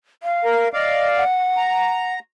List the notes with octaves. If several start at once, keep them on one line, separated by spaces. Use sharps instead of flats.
F5
A#4
D5 D#5 F5
F#5
A#5